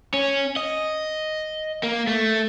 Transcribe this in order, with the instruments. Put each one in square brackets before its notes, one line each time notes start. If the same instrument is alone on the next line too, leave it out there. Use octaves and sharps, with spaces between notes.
[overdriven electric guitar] C#4
D#5
A#3
A3